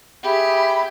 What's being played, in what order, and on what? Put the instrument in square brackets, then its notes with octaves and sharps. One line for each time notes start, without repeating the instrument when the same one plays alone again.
[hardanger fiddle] G4 [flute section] G#4 E5 B5